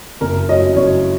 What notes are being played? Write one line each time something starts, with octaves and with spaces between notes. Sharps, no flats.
F#1 A#4
F#2 F#3 C#4 D#5
F#1 C#5